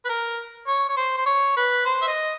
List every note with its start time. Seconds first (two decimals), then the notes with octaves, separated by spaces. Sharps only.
0.05 B4
0.09 A#4
0.67 C#5
0.89 C#5
0.97 C5
1.18 C5
1.26 C#5
1.56 B4
1.85 C5
2.02 E5
2.08 D#5